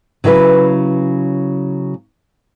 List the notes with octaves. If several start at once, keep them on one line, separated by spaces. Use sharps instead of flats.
C#3 F#3 E4 B4